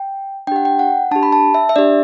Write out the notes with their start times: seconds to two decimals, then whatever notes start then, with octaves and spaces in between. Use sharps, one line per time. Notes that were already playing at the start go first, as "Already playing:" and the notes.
Already playing: G5
0.47 D4 G5
0.52 G4 F#5
0.65 G5
0.79 F#5
1.11 D4 G4 A5
1.23 B5
1.32 A5
1.54 E5
1.69 E5
1.76 D4 G4 D5